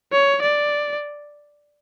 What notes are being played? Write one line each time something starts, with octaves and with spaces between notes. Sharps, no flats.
C#5
D5